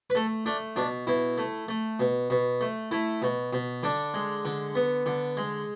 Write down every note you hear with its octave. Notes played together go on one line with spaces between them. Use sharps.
B4
A3 A4
A3 D4
B2 D4
B2 E4
A3
A3
B2
B2
A3
A3 E4
B2
B2
D3 D4
G#3
D3
B3
D3
G#3